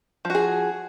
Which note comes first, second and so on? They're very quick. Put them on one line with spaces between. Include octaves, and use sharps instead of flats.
F3 F#4 G#4